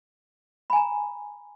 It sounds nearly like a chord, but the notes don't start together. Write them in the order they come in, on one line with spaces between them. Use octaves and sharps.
B5 G#5 A#5